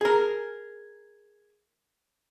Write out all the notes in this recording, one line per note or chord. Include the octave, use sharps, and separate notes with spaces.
G#4 A#4